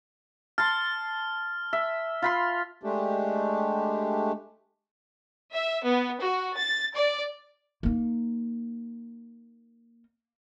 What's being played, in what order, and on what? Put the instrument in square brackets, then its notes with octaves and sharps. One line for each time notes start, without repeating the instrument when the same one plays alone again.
[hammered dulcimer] A5 C6 [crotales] F6
[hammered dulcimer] E5
F4 B5 C6
[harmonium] G#3 A3 D4 G4
[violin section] E5
B3
F#4
A6
D5
[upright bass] A#3 D#4